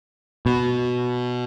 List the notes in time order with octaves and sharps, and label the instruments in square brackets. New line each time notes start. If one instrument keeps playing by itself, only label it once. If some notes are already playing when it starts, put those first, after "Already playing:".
[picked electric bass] B2